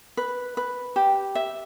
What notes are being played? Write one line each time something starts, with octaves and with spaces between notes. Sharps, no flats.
B4
B4
G4
E5